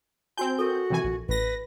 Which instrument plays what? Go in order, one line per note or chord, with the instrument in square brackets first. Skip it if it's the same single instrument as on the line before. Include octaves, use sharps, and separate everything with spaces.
[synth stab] C4 G6 [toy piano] F#4 G#5 A5
[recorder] F#4 [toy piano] A4 A#4
[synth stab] C3 E3 G#5
A#1
[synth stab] A1 A#6 [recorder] B4